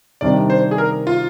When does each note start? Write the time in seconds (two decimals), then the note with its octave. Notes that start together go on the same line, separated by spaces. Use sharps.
0.21 C3 D#3 G3 D4 G4 D5
0.50 C5
0.71 G#4
0.78 A#4
1.07 F4